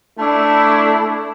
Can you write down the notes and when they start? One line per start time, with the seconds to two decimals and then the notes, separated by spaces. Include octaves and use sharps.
0.19 A3 D4 E4